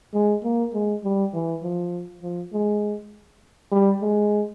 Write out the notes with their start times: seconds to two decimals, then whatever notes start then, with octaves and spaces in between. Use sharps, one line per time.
0.14 G#3
0.44 A#3
0.74 G#3
1.04 G3
1.34 E3
1.63 F3
2.23 F3
2.53 G#3
3.72 G3
4.02 G#3